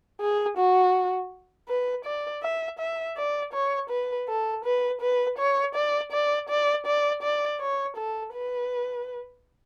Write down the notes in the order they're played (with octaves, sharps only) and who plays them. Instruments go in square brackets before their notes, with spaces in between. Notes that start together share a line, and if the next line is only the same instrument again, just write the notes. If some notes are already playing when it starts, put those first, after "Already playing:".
[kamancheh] G#4
F#4
B4
D5
E5
E5
D5
C#5
B4
A4
B4
B4
C#5
D5
D5
D5
D5
D5
C#5
A4
B4